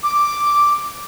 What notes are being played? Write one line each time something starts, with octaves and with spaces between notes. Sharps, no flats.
D6